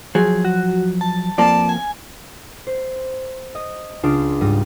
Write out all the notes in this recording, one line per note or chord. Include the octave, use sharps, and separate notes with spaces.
F3 F#3 G#4
F#4
A5
F2 F3 A#3 D5 A5
G#5
C5
D#5
C#2 D4 F4 D#6 A#6 D7
G#2 G3 A#6 D#7